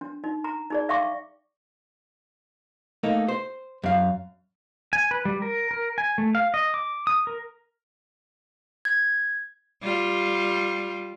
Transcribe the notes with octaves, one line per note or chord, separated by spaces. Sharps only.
D4
D#4
A#5
D#4 G#4 D5
E5 F5 G5 C#6 D6
A3 A#3 D#4
C5
F#2 F5
G#5
B4
G3
A#4
A#4
G#5
A3
F5
D#5
D6
D#6
A#4
G#6
G3 F4